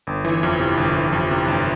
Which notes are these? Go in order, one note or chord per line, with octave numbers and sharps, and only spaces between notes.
G1
E3
F2
C3
G1
E3
F2
C3
G1